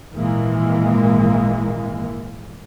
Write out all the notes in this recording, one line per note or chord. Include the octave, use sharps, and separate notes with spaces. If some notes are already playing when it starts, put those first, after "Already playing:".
G#1 A#2 E3 G#3 A#3